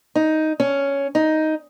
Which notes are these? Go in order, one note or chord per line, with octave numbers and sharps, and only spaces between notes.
D#4
C#4
D#4